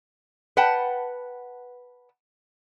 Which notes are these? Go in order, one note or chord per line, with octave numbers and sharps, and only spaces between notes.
B4 F#5 G5 A5